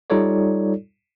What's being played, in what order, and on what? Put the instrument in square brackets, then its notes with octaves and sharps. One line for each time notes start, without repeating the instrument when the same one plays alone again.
[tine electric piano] G3 D#4 F4 A4 C#5 D5